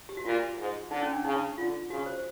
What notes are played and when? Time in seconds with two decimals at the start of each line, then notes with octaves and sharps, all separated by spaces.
0.09 G4
0.17 F#4
0.25 A#2 F4
0.58 G#2
0.91 D3 D#4
1.02 C#4
1.13 D4
1.24 C#3 D#4
1.58 D3 F4
1.90 C#3 F#4
2.06 C5